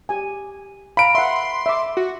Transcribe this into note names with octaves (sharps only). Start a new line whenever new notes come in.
G4 G#5
F5 A#5 B5 D7
E5 F#5 C6
E5 D6
F#4